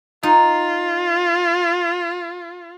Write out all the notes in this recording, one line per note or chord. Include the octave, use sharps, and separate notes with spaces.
D#4 F4